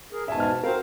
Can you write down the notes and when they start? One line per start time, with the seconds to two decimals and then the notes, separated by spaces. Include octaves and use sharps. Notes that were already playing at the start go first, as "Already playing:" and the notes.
0.12 G#4 A#4
0.28 G#2 B2 E5 G#5 A5
0.40 A5 F6
0.64 C4 F#4 A#4 C5 F5